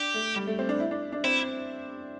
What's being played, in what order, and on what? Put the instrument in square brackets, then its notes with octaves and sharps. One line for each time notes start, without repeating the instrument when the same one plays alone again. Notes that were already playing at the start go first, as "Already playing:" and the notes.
Already playing: [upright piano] D4 [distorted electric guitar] G4
[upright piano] A3
G3
A3
C4
D4
E4
D4
D4
[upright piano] C4 [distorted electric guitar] E4